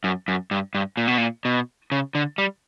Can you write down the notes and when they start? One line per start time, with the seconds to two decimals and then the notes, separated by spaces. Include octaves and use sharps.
0.04 F#2
0.28 F#2
0.51 G2
0.75 G2
0.97 A#2
1.08 B2
1.18 A#2
1.45 B2
1.92 C#3
2.15 D3
2.38 G3